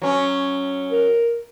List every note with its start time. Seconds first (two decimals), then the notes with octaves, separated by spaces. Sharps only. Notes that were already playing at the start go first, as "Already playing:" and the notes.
0.02 F#3 C#4
0.91 A#4